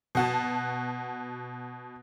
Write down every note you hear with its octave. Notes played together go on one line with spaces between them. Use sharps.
B2 F#4 A5